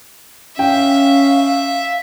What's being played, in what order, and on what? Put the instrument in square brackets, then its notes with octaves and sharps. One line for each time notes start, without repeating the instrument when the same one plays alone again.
[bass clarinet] C#4 [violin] E5 [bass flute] F5 [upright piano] G5